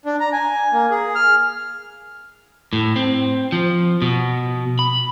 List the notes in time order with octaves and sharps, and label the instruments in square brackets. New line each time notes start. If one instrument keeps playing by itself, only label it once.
[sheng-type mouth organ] D4
A#5
G#5
A#3
G#4
F6
[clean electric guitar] A2
C4
F3
B2
B5